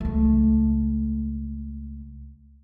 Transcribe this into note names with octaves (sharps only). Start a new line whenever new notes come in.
C#2 A3